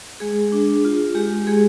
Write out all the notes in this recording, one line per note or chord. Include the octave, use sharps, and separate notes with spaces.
G#3 G#4
D4
F4
G#3 G4
G#3 G#4